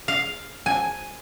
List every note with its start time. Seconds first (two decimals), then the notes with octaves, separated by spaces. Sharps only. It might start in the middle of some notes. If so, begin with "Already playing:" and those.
0.08 F5
0.66 G#5